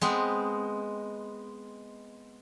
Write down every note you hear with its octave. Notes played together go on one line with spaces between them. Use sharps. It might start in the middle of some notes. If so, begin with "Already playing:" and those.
G#3 B3 C4